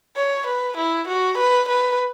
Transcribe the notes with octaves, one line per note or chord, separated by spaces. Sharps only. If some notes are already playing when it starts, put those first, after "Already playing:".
C#5
B4
E4
F#4
B4
B4